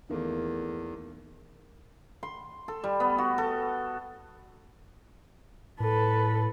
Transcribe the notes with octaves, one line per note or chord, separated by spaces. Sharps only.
E2 D#3 A3 A#3
C6
A4
G3
B3
F#4
A4
A2 A4 B4